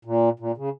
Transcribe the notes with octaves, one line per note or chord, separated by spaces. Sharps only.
A#2
A#2
C#3